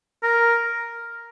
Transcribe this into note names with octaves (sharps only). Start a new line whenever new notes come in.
A#4